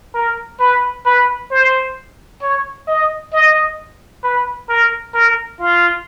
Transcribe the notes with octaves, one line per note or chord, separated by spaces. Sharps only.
A#4
B4
B4
C5
C#5
D#5
D#5
B4
A#4
A#4
F4